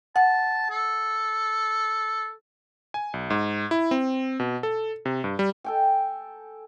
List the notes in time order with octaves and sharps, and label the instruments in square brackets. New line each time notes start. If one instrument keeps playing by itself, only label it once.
[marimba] F#5 [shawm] A5
[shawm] A4
[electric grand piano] G#5
B1
G#2
E4
C4
B2
A4
C3
G2
G3
[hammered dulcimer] A4 G5 G#5